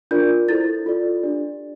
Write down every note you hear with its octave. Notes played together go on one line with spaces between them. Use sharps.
D4 F4 A#4 D5 G6
E4 A4 C5 A6
F4 A4 D5
D4 G4 D5